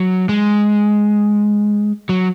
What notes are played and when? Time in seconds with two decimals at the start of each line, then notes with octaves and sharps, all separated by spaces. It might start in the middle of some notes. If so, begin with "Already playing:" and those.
Already playing: F#3
0.29 G#3
2.09 F#3